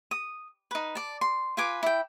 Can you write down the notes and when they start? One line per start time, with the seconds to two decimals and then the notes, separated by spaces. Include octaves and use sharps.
0.11 D#6
0.71 D#4 B4
0.95 D5 A5
1.21 C6
1.57 F4 B4 G#5 D6
1.83 E4 G5